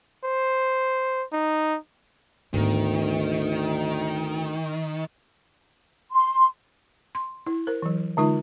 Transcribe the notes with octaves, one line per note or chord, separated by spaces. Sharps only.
C5
D#4
D2 G#2 D#3 B3
C6
C6
E4
A#4 C5
E3 F#3
D3 G#3 D#4 F4